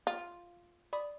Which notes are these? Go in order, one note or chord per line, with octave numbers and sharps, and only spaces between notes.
F4
D5 B5 D#6